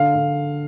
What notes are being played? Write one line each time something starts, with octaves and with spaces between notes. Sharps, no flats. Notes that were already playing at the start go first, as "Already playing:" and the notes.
Already playing: D3 F5
D3